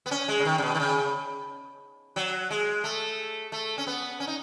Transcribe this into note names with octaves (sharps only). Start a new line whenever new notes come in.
B3
C#4
G#3
C#3
D#3
C#3
B2
D#3
C#3
F#3
G#3
A3
A3
C#4
B3
C#4
D#4